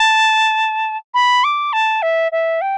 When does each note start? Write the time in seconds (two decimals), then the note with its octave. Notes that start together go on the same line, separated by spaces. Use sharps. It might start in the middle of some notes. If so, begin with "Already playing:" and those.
Already playing: A5
1.14 B5
1.44 D6
1.73 A5
2.02 E5
2.32 E5
2.61 G5